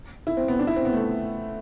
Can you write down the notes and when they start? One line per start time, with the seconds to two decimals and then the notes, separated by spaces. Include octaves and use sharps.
0.27 E4
0.37 C4
0.48 B3
0.59 D4
0.67 E4
0.76 C4
0.85 B3
0.93 A3